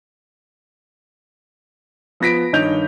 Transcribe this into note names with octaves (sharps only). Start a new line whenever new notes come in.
F3 B3 A#6 B6 D7
G2 D#3 C#5 D#5 G6 F7